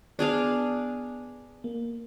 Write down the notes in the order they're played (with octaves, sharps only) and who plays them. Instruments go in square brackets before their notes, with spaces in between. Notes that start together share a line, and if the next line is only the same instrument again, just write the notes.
[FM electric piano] B3 [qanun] D4 G#4 D5 F5
[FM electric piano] A#3